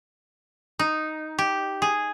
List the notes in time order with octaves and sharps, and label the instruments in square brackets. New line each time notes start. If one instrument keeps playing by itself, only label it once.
[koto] D#4
G4
G#4